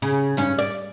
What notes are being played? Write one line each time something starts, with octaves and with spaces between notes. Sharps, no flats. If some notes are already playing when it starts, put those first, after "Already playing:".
C#3
G2 C#4
D5